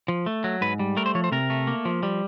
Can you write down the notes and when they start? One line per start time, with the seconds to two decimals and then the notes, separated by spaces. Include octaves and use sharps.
0.08 F3
0.26 A3
0.44 F#3
0.61 G#2 B4
0.79 G3
0.97 A3 A#4
1.06 C5
1.15 F3 C#5
1.24 C5
1.32 C3 A#4
1.50 A3
1.67 A#3
1.85 F3
2.03 G3